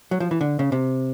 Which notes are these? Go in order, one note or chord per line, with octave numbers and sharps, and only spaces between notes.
F#3
F3
E3
D3
C#3
C3